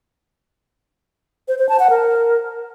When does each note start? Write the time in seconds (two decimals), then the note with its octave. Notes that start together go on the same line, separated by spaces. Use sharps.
1.48 C5
1.59 C5
1.69 A5
1.79 F#5
1.90 A#4